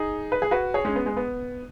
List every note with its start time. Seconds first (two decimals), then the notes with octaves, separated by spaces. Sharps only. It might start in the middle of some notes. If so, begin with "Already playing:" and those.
Already playing: D#4 G#4
0.32 B4
0.42 G#4
0.51 F#4 B4
0.74 G#4 C#5
0.85 G#3 C#4
0.96 B3
1.06 G#3
1.17 B3